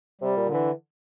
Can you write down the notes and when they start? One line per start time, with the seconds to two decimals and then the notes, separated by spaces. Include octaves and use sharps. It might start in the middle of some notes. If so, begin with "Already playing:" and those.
0.21 C3 G3
0.37 A#2
0.46 D3
0.54 E3